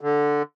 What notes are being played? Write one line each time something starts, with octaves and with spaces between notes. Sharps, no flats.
D3